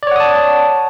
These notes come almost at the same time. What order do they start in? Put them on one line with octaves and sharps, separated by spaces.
D5 C#5 F#5 D#6 A5